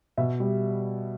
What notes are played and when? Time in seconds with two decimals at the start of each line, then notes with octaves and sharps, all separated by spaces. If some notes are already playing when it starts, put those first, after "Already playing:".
0.17 B2 E5
0.40 G3